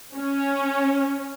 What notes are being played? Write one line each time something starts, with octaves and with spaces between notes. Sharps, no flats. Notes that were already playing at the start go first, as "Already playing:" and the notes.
C#4